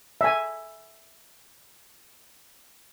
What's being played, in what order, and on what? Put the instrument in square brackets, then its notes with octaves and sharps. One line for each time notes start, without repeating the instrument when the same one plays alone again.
[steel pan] E5 G#5